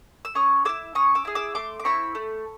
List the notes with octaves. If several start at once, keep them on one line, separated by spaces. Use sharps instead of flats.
E6
C#4 C#6 D#6
E4 G#4 D6 E6
C#4 C#6 D#6
D6 E6
E4 G#4
D6 E6
A3 C6 D6
D6
C4 E4 B5 C#6
A3